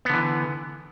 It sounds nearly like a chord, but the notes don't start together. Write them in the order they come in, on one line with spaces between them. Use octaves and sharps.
B3 D3 E3